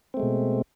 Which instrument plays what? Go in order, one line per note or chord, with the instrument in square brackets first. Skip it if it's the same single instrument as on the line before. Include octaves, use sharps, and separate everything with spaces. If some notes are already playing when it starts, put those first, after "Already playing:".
[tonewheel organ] C4
A3
G#3
B2